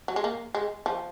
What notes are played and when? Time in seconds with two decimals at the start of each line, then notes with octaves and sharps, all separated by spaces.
0.08 F#3
0.16 G#3
0.24 A#3
0.55 G#3
0.86 F3